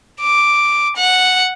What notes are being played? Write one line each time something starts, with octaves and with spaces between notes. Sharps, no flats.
D6
F#5